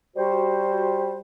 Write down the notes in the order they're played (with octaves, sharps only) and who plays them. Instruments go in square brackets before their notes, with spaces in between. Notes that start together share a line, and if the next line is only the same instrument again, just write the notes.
[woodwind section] G3 F#4 C5